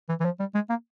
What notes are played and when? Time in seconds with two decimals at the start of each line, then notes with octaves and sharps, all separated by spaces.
0.09 E3
0.20 E3
0.25 F3
0.40 G3
0.55 G#3
0.70 A#3